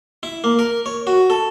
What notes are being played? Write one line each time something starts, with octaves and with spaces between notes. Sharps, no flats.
E4
A#3
A#4
C#5
F#4
A4